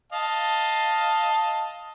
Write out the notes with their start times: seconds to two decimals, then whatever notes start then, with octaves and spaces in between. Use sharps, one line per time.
0.12 D#5 F5 A5